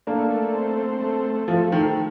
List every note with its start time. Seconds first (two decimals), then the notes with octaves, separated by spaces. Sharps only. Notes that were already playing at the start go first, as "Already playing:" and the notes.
0.07 A3 A#3 D4
0.31 A3
0.55 C4
0.78 C4
1.02 A3
1.25 A3
1.48 F3 A3
1.72 D#3 A3